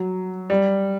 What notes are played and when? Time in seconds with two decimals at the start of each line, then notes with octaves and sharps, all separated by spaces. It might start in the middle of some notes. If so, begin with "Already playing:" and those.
Already playing: F#3
0.50 G3